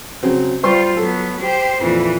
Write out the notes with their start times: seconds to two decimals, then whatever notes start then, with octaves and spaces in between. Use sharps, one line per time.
0.23 C#3 F#3 C4
0.63 G3 F4 C5 C6
0.97 F#3 B3 A4
1.40 G4 C5
1.81 F2 A#2 E3